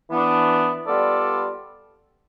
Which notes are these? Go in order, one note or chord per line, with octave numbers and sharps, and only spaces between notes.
E3 B3 D4
G3 B3 F4 A4 D5